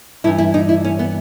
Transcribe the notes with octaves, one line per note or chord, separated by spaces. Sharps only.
G2 E3 E4
E4
D#4
E4
C#4
B3